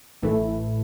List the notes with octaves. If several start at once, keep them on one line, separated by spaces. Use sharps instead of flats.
A1 A2 E3 A3 E4